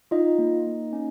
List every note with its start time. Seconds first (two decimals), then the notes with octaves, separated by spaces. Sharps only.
0.11 D#4 F4 D#5
0.38 A#3
0.67 A#3
0.93 C#4